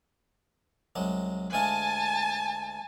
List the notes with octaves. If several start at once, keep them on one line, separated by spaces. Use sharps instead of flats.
C2 F#3 G#3
D2 G#3 F5 G#5 A5